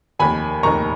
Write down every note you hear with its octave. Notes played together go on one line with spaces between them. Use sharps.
F1 D#2 D#3 A#3 G#5 B5
F1 D#2 D#3 A#3 A#5 C#6